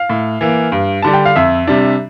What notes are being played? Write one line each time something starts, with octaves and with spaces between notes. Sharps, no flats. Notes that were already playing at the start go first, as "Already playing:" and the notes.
Already playing: F5
A2
E3 A#3
G2
D3 G3 D4 A5
G5
F5
F2 E5
C3 G3 D4